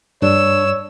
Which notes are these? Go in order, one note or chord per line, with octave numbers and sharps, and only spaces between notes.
G2 D4 C#5 E6